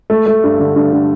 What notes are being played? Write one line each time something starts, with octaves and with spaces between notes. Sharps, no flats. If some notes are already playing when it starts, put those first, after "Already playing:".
A3
A3
G2
D3
G2
D3